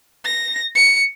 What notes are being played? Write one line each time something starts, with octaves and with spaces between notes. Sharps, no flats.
A#6
C#7